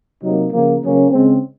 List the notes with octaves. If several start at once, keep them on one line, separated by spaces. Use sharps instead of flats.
C3 F#3 A#3 D#4
C#3 F3 A#3
C#3 F#3 A#3 C#4
C#3 G#3 C4